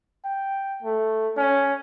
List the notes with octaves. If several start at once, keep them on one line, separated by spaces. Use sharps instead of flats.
G5
A3
C#4